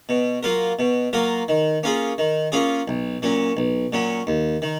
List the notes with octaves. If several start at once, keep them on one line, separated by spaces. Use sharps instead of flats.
B2
F#3 A#3 F4 A#4
B2
F#3 A#3 F4 A#4
D#3
A#3 C#4 F4 G#4
D#3
A#3 C#4 F4 G#4
B1
A#2 F#3 C#4
B1
A#2 F#3 C#4
D#2
D#3